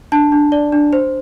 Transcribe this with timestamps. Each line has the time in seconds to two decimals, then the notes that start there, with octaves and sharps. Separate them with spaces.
0.12 D4 A5
0.32 D4
0.52 D5
0.72 D4
0.93 C5